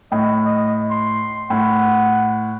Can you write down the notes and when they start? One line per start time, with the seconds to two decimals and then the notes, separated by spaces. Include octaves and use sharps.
0.12 A2 D#5
0.45 D#5
0.91 C6
1.50 A2 F#5